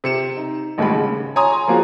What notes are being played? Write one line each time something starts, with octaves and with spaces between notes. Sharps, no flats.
C3 C#7 E7
D#4
A1 D#2 G#2 D#3 G3 B5
C#3
C#5 G#5 A#5 C6 D#6
F3 A#3 F#4 G#4